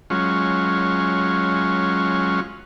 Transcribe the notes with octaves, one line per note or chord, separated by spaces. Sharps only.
F#3 G#3 C#4 F4